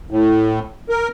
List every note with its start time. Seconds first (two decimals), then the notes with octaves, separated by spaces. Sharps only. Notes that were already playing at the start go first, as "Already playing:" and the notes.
0.11 A2
0.89 A#4